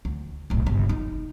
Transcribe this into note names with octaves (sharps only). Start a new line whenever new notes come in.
D2
D1 B1
G1 C#3
D#4